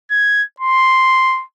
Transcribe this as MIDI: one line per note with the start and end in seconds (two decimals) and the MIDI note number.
0.11 0.43 92
0.60 1.43 84